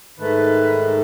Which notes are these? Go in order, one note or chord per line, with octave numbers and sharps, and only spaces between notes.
G#2 D#3 A3 B4